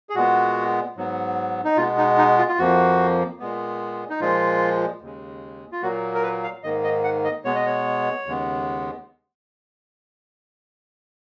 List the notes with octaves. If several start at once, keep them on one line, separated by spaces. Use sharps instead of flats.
G#4
A#2 G#3 B3 F#4
G#2 F#3 B3
D#4
B2 G#3 B3 F4
D#4
D#4
F4
F4
F2 F3 A#3 F#4
A#2 G#3 B3
D#4
A#2 F3 G#3 F4
D#2 C#3 G#3
F4
A#2 F#3 A#3 F#4
A#4
B4
F5
G#2 D#3 A#3 D#5
D#5
F#5
D#5
B2 G#3 B3 C#5
D#5
C#5
D#2 C#3 G#3 B3